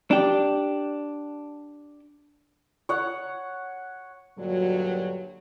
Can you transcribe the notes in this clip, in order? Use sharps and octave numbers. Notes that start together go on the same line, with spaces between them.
D4 G4
C#5 F#5
G2 A#2 D3 F#3